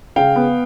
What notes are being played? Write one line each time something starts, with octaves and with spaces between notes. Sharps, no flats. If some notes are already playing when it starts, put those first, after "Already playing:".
C#3 F5 G5
B3